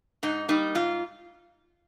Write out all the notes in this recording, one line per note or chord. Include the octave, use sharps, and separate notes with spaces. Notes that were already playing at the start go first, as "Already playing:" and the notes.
G#2 D#4
G3 A#3 D#4
G#2 F4